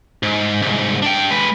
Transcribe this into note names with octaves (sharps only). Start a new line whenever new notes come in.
G#2
C2 G#2
D4 G5
G#3 B4